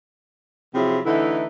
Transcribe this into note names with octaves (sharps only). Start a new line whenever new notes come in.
C3 F3 F#3 E4 G#4
D3 E3 A3 D#4 E4